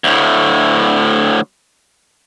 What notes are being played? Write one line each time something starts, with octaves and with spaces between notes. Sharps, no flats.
D2 A2